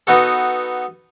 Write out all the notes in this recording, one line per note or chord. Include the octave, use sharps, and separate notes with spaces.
B3 D#4 F#4 A4